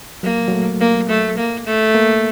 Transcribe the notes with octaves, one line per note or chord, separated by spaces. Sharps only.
F#3 A#3
F#3
A3
A#3
A3
A#3
A3
A#3